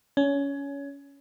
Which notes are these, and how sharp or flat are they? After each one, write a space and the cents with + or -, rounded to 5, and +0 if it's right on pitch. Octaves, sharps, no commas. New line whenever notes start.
C#4 +20